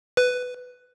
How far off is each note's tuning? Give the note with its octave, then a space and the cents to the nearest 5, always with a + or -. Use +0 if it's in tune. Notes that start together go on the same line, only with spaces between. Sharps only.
B4 +10